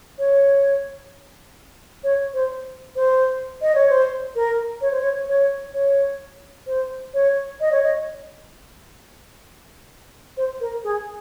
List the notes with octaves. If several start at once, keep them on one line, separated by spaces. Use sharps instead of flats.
C#5
C#5
C5
C5
D#5
C#5
C5
A#4
C#5
C5
C#5
C#5
C#5
C5
C#5
D#5
C#5
D#5
C5
A#4
G#4